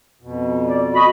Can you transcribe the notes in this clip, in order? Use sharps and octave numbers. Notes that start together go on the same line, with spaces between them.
F2 B2
D5
F#4 D#5 B5